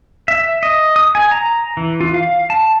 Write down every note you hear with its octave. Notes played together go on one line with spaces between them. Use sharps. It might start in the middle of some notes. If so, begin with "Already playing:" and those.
E5
D#5
D#6
G#5
A#5
E3
F4
F5
A5